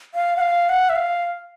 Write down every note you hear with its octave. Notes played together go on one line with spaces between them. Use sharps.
F5
F#5
F5
F#5
E5
F5